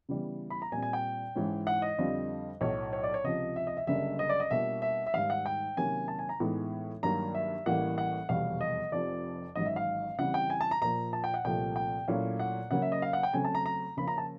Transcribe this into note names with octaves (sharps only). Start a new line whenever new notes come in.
C#3 E3 G3 B3
B5
A#5
A#2 G3 C4 G#5
G#5
G5
G#2 E3 G#3 C#4
F#5
D#5
F2 D3 G3 C4 F4
B1 A2 F#3 C#5
C#5
D5
C#5
C#2 C3 F3 D#5
E5
D#5
E5
F#1 F#2 D3 G3 A#3 E5
D#5
D5
D#5
B2 G3 A#3 D4 F4 E5
E5
E5
G#2 D#3 G3 F5
F#5
G5
C3 D#3 F#3 A#3 C#4 G#5
A5
G#5
A#5
A2 E3 G#3 B3 D#4
G2 D#3 F#3 A#3 A#5
E5
A1 A2 E3 G3 A#3 F#5
F#5
F1 E2 B2 G3 B3 F5
D#5
F1 F2 C3 F3 D5
A1 G#2 D#3 F#3 D#5
E5
F5
C#3 E3 G3 C4 F#5
G5
G#5
A5
A#5
A#2 F3 A#3 A#5
A5
G5
F#5
C2 A#2 F3 A3 G5
G5
A#2 F#3 A3 C#4 E4 F5
F#5
C#3 F#3 A#3 C#4 F#5
E5
D#5
F5
F#5
G5
C#3 F#3 A3 C4 G#5
A5
A#5
A#5
C#3 F3 A#3 C#4 F4 B5
A#5
A5